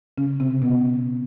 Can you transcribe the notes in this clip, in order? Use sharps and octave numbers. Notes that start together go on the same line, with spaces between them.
C#3 C#4
C3 C4
B2 B3